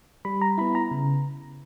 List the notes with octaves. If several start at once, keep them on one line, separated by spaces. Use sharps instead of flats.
G3 B5
A#5
B3 E4 B5
A#5
C#3